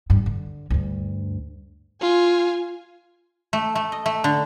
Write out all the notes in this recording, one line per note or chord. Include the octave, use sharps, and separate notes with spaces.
G2
D3
D2 G2
F4 G#5
A3
A3
D#5
A3
D3